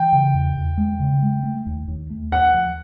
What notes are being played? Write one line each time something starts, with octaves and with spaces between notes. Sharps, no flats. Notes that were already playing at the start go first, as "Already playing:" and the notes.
Already playing: E3 G5
C#3
E2
E2
G#3
C#3
G#3
A3
D#2
D#2
A3
D#2 F#5
F3